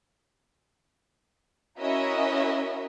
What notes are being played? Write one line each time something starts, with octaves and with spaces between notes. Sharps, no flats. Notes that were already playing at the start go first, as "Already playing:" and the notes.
C#4 E4 F#4 A#4 D#5 E5